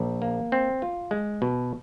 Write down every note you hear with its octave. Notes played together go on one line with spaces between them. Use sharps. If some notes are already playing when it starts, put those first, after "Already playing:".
Already playing: A#1
A#3
C4
F4
G#3
B2